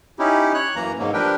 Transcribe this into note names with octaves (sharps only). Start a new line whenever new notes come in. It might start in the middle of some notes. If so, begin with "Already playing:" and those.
C#4 D#4 E4 G4
C#5 F#6
F#2 E3 A#3 A#5
G#2 B2 F#3 A#3
F3 D4 G4 A#4 B4 G5